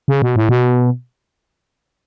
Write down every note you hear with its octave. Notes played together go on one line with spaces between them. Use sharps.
C#3
B2
A2
B2